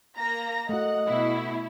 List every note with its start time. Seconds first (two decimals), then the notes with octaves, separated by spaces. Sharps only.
0.15 A#3 A#5 A#6
0.69 A3 F#4 D#5 F#5
1.06 B2 E4